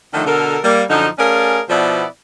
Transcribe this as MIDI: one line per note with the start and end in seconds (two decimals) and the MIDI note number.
0.14 0.24 50
0.14 0.24 51
0.14 0.24 53
0.14 0.24 57
0.14 0.24 62
0.14 0.24 63
0.26 0.58 47
0.26 0.58 50
0.26 0.58 69
0.26 0.58 70
0.64 0.84 55
0.64 0.84 58
0.90 1.08 42
0.90 1.08 50
0.90 1.08 53
0.90 1.08 63
1.18 1.61 57
1.18 1.61 61
1.18 1.61 68
1.18 1.61 70
1.18 1.61 74
1.18 1.61 77
1.69 2.05 47
1.69 2.05 53
1.69 2.05 59
1.69 2.05 64
1.69 2.05 74